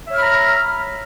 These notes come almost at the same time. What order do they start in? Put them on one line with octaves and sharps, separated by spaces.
E5 C#5 F6 B5 A#5